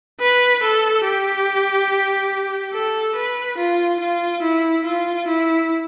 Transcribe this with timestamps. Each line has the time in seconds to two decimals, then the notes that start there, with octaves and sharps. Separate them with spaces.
0.20 B4
0.62 A4
1.04 G4
2.73 A4
3.16 B4
3.57 F4
4.00 F4
4.42 E4
4.85 F4
5.27 E4